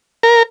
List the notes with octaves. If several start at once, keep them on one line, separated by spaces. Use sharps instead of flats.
A#4